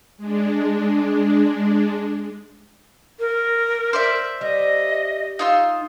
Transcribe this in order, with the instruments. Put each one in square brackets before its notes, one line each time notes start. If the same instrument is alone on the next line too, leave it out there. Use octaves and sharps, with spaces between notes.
[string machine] G#3 D4
[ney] A#4
[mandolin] C5 D5 E5
[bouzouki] G3 [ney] D#5
[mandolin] D#4 F4 E6